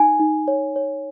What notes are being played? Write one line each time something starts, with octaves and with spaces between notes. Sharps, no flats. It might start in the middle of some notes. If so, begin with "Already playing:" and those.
Already playing: D#4 G#5
D#4
C#5
C#5